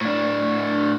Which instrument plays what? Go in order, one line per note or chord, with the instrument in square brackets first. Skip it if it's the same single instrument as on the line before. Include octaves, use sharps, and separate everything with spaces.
[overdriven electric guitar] A2 D4